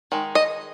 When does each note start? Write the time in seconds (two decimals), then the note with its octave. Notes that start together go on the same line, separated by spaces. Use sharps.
0.12 D#3 G#3
0.35 D#5